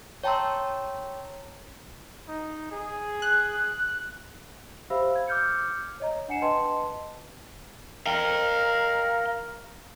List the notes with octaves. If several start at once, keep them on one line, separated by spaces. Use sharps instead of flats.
C#5 G5 A5 A#5 C6 E6
D#4
G#4
F#6
G4 C5 E5 F5 B5 E6
G#6
D6 E6 F6 G6 G#6 C#7
C#5 D#5 A#5
D4 F#5 G#5 C7 C#7 E7
B4 D#5 G5 A5 C6
A#4 F5 G5